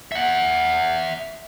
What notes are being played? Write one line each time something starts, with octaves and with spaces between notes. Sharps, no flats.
E5 F#5